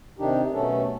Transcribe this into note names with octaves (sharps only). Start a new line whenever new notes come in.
C3 D#3 D4 D#4 G4
B2 F#3 A3 C#4 A4